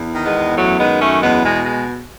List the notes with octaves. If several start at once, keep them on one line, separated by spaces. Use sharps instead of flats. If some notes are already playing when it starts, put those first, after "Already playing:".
Already playing: E2
D#3
G#3 B3
E2
F#2 F#3 A3
D#3 G#3 B3
F#2 A3 C#4
E2 G#3 B3
B2 G#3
G#3